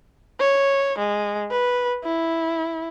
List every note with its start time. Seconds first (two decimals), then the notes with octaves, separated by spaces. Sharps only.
0.40 C#5
0.98 G#3
1.51 B4
2.04 E4